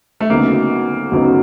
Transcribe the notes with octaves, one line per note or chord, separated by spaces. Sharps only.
A3
D2 C#3 F#3 A#3 B3 D#4
D2 C#3 F#3 B3 D#4